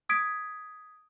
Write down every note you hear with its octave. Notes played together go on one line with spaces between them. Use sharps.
D#6 G#6 B6 D7